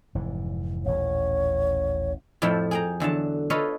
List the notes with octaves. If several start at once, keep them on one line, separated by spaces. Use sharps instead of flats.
F1 G#2 E3
D#1 A1 C#5
F2 A2 F3 A3 G5 B5
G#4 G5 A#5
E2 D3 F#3 A5
F4 A4 B4 C#5 D#5 F5